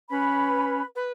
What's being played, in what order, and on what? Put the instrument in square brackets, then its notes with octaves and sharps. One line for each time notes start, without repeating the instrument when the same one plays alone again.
[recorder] C#4 [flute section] B4 B5
[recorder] B4